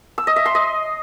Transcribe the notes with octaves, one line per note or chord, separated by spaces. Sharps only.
E6
D#5
E5
C6
D#5